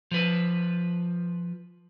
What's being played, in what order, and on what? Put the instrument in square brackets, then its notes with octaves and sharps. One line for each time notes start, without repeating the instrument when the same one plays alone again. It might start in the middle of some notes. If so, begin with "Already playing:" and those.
[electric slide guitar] F3 B4